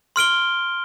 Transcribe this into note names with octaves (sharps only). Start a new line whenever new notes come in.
C6 F6 D7 G7